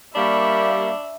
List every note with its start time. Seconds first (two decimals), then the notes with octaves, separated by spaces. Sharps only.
0.15 G3 A#3 D4 E5 B5 C#6